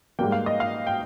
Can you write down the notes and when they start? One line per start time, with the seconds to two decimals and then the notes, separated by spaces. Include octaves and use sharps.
0.19 G#2 G3 A#3 G5
0.32 F5
0.46 D#5
0.60 F5
0.87 G5